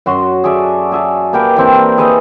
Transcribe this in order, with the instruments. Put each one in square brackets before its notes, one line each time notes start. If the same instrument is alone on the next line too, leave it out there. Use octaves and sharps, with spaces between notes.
[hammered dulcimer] F#2 F#4 C6
G#4 A4 D5 E5
G#4 E5 A5
A#3 G4 A#4 B4
E3 C4 D4
G#4 B4 D#5 E5